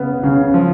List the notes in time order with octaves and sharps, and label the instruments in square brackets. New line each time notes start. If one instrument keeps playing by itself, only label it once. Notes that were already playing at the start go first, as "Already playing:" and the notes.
Already playing: [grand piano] C#3 B3
C#3
F3